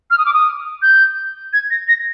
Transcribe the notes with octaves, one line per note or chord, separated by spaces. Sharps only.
F6
D#6
D6
D#6
G6
G#6
A#6
A#6